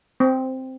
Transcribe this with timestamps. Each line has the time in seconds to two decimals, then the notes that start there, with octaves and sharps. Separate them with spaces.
0.20 C4